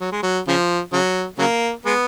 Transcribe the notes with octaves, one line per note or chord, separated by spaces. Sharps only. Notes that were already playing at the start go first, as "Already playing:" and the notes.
F#3
G#3
F#3
C#3 F3
C#3 F#3
C#3 F#3 A#3
G#3 B3